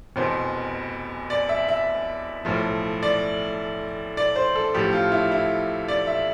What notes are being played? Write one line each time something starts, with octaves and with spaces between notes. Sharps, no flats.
F1 E2 B2 C5
D5
E5
E5
B1 A2 F3
D5
D5
C5
A4
A1 A2 F3 G4
F4
E4
E4
D5
E5